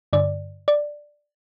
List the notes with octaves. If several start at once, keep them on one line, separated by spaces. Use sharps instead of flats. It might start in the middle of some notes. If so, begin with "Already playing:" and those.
G2 D3 D5
D5